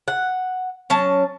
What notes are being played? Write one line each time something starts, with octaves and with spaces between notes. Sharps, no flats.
F#5
F#3 C#4 A5